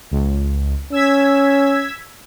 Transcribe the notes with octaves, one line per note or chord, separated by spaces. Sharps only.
C#2
C#4 E6 G#6 B6